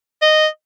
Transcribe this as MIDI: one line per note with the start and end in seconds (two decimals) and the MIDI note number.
0.22 0.47 75